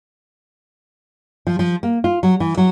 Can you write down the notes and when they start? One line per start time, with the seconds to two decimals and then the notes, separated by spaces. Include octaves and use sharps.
1.47 F3
1.59 F3
1.83 A#3
2.04 F4
2.23 F#3
2.40 E3
2.57 F#3